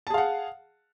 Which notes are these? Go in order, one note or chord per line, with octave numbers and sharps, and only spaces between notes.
G#4 F5 F#5 A5